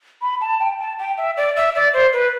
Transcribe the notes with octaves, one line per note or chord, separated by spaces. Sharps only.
B5
A5
G5
A5
G5
E5
D5
E5
D5
C5
B4